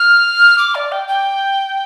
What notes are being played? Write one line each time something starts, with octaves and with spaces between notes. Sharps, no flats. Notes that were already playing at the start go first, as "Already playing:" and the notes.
Already playing: F6
D6
D5
G5
G5